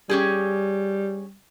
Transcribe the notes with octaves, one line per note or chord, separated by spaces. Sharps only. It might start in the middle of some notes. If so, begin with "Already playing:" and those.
G3 C#4 G4 G#4